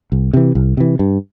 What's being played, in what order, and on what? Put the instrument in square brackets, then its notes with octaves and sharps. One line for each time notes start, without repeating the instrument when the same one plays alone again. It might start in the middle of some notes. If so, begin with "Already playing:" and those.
[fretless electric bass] C2
C3 E3
C2
C3 E3
G2